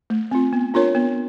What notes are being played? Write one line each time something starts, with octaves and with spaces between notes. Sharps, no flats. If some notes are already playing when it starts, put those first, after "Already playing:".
A3
C4 F4
B3
D4 F4 A#4 C#5
B3